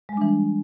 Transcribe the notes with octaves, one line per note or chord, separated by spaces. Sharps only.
E3 G3 G#3 D4